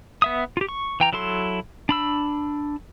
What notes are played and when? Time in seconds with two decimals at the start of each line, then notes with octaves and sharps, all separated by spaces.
0.22 B3 E5 D#6
0.57 F4 G4
0.69 C#6
1.00 E3 G5 A#5
1.13 F#3 E4 A4 C6
1.89 D4 B5 E6